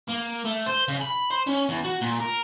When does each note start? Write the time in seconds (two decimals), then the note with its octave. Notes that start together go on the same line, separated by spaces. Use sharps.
0.08 A#3
0.45 A3
0.66 C5
0.88 C#3
1.01 B5
1.30 C5
1.47 C#4
1.69 E2
1.84 F#4
2.01 A#2
2.20 A#4